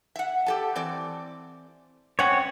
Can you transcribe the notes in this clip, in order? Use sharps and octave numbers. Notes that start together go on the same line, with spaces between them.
E5 F#5
G4 A4 A5
E3 C4 D5
G#3 C4 C#4 C#5 F#5